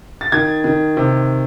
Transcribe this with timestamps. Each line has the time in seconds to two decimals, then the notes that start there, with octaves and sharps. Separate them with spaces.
0.21 A6
0.32 D#3 G#6
0.64 D#3
0.97 C3